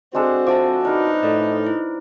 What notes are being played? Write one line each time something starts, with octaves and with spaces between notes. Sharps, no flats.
G#3 C4 D4 F#4 A4
F3 E5 A5 D6
D4 D#4 A#4 B4
A2 A4 D5 D#5
E4